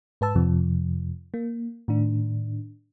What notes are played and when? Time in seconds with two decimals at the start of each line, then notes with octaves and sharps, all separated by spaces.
0.21 G#2 B4 A5 E6
0.35 F2 C3 F3
1.34 A#3
1.88 A2 D#3 D4